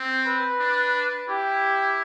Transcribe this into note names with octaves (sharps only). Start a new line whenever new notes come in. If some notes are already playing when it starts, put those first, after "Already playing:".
Already playing: C4
B4
D4
E4 G4